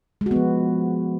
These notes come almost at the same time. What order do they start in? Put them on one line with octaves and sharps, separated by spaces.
G#3 F#4 B3 F3